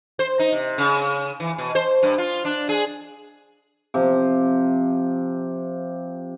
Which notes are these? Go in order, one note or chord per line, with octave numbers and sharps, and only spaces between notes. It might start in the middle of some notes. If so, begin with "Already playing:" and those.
C5
D#4
C3
C#3
E3
B2
C5
G2
F4
D4
G#4
C3 F3